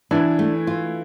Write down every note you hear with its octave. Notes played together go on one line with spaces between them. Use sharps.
E3 D4 E4
A3
F4